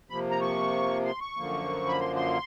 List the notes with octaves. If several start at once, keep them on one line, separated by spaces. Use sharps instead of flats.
C3 F3 A#3 B5
A#5
C#6
C6
C#6
F#2 D3 F3 A#3
B5
C6
C6